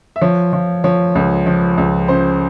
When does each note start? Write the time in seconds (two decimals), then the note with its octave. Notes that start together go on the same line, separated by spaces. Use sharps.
0.16 E5
0.21 F3 C#5
0.53 F3
0.84 F3 C#5
1.15 C#2
1.46 F3
1.77 C#2
2.08 C#3 C5